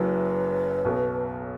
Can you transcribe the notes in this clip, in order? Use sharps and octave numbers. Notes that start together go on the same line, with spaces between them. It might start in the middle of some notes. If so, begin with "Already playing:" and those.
Already playing: F#1 F#2 F#3 E4 B4
B1 B2 B3